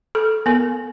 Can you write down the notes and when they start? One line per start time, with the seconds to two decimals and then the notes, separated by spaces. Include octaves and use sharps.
0.15 A4
0.46 B3 A#4